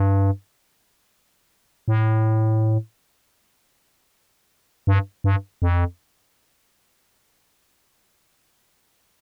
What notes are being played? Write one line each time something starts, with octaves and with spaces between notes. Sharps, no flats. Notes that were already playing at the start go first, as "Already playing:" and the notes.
Already playing: G2
A2
G2
G2
F2